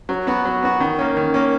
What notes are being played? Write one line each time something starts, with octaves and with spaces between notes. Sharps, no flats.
F#3
B3 F#4
F#3
B3 F#4
D#3
A#3 C#4
D#3
A#3 C#4